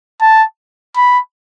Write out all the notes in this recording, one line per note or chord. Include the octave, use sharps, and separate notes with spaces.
A5
B5